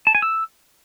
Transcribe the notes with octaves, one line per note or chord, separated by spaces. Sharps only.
A5
G#5
E6